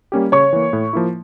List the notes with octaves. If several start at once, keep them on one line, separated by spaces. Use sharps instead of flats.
G3 A#3 C#4 G4
C#3 C#5 C#6
E3 A#3
A2
F3 A#3 E4